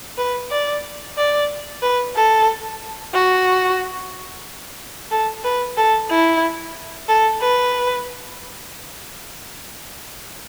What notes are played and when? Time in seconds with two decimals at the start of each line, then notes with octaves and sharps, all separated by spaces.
0.18 B4
0.51 D5
1.17 D5
1.82 B4
2.16 A4
3.14 F#4
5.11 A4
5.44 B4
5.77 A4
6.10 E4
7.09 A4
7.41 B4